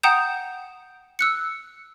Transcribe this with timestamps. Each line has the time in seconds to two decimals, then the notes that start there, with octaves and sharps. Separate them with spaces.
0.03 F#5 G5 A#5 D#6 G6 E7
1.19 E6 F#6 C#7